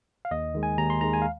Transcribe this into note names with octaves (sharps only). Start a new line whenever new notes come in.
F5
D#2 D#5
D#3 G#3
G#5
D#2 A#5
C6
D#3 G#3 A#5
G#5
F5